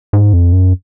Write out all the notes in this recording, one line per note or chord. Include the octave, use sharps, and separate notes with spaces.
G#2
F2
F#2